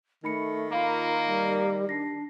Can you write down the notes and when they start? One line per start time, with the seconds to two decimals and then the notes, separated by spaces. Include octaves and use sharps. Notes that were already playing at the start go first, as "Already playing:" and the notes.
0.24 D#3 A3 D#4 B5 C#7
0.73 A#3 F4 F5 A#5 B5
1.27 G3
1.89 D4 A#6 C7